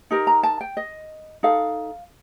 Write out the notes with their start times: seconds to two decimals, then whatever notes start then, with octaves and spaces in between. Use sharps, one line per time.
0.11 D#4 G4 A#4
0.27 A#5
0.43 A5
0.61 G5
0.77 D#5
1.43 D#4 A4 F5